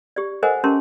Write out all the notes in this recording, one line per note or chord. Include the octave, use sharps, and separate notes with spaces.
G4 D5
A4 A#4 C5 D#5 F#5 G#5
C#4 G4 A#4 A5 C6